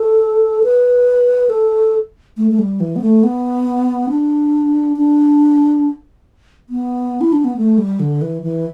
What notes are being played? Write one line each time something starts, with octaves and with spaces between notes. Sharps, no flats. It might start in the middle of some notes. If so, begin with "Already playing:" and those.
Already playing: A4
B4
A4
A3
A3
G3
E3
B3
A3
B3
D4
D4
B3
E4
D4
B3
A3
G3
D3
E3
E3